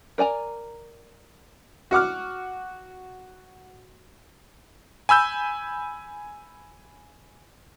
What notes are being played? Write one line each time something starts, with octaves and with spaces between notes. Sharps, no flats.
A#4 D5 G#5 A#5
F#4 F#5 D6 F6
G#5 B5 E6 G6